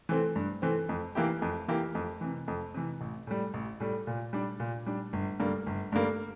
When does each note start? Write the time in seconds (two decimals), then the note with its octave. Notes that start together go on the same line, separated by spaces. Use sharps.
0.09 E3 A3 C4
0.36 G2
0.62 E3 A3 C4
0.89 F2
1.15 E3 A#3 E4 G4
1.42 F2
1.68 E3 A#3 E4 G4
1.95 F2
2.21 C3 E3
2.48 F2
2.74 C3 E3
3.01 A1
3.27 A2 G3
3.54 A1
3.80 A2 G3
4.07 A#2
4.33 G3 D4
4.60 A#2
4.86 G3 D4
5.13 G1
5.40 G2 D3 G3 A#3
5.66 G1
5.92 G2 D3 G3 A#3